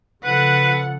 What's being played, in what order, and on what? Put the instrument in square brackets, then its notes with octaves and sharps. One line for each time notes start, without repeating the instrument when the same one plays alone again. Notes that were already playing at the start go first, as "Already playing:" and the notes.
[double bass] C#3 F3 [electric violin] A4 F#5 [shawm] B4